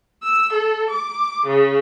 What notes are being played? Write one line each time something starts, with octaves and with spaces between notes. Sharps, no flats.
E6
A4
D6
C#3